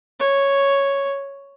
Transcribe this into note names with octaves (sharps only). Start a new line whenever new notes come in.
C#5